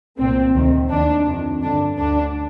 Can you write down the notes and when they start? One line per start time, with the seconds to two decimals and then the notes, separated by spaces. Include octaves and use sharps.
0.18 C2 A#2 C4
0.54 D2 C3 D#3
0.90 D#2 D#3 D4
1.26 F2 C3 D#3
1.62 G2 D3 D4
1.98 D2 D3 D4